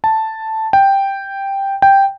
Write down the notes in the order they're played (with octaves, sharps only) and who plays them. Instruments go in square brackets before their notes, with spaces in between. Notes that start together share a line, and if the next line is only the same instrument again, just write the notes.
[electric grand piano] A5
G5
G5